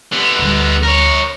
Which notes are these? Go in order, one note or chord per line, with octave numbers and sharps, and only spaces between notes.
D3 B3
D2 G3
A#4 C#5